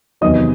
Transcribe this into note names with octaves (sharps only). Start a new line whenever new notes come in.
E2 C3 D#3 F#3 D#5 D#6